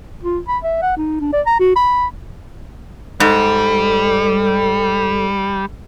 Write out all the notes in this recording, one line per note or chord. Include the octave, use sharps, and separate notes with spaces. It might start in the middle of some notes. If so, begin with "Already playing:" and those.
F4
B5
E5
F#5
D#4
D4
D5
A#5
F#4
B5
G#2 G3 A4